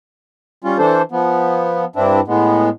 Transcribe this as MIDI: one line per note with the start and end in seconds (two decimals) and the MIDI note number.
0.64 0.78 55
0.64 0.78 61
0.64 0.78 65
0.78 1.02 52
0.78 1.02 62
0.78 1.02 69
0.78 1.02 72
1.12 1.85 53
1.12 1.85 59
1.96 2.20 43
1.96 2.20 60
1.96 2.20 62
1.96 2.20 64
2.28 2.69 45
2.28 2.69 56
2.28 2.69 59